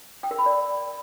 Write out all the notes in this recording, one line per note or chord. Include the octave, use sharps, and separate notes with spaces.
G5
A#4
B5
D5